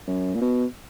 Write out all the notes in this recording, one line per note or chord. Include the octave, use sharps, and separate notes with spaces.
F#2
A#2
B2